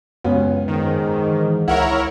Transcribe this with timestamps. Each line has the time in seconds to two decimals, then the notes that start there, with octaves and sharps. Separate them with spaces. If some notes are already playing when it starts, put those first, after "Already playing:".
0.24 C#2 F#2 B3 C#4
0.68 G#2 D#3
1.31 E3
1.68 C#2 E4 A#4 C#5 F#5